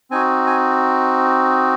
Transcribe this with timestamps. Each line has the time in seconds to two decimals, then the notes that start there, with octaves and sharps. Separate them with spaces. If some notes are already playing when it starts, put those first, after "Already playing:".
0.11 C4 D#4 F#4 G#5
0.46 G#5